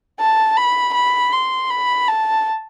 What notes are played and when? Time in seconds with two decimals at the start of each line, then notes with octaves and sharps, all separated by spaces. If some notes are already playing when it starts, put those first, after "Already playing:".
0.20 A5
0.57 B5
0.94 B5
1.32 C6
1.70 B5
2.08 A5